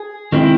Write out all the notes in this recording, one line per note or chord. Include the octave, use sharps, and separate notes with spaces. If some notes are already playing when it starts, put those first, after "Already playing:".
Already playing: G#4
D#3 G#3 C4 E4